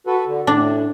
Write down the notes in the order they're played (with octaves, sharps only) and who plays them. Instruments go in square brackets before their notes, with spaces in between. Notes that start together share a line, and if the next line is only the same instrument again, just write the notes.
[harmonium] F#4 A4 B4
D3
[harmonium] A2 [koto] D4